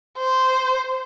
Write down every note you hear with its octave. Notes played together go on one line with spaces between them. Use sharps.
C5